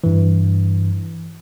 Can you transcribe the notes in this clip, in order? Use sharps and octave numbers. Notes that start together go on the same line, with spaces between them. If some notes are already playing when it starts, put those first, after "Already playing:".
G2 E3